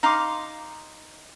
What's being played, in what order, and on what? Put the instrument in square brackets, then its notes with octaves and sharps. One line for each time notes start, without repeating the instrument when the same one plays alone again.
[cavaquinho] D#4 F5 C6 D6